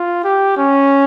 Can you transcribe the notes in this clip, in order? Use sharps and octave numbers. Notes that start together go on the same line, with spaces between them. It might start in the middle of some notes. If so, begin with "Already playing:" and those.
Already playing: F4
G4
C#4